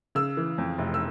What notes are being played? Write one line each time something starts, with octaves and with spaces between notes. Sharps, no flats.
C#3 E6
E3
F2
F1
E6